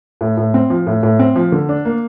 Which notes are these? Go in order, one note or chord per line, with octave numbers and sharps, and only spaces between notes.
A2
A2
C4
F3
A2
A2
C4
F3
D3
D4
A#3